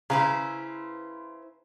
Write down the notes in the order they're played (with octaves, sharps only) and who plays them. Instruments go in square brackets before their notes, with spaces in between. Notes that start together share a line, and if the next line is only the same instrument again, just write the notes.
[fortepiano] C#3 [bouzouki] E4 B4 C5 [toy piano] A#5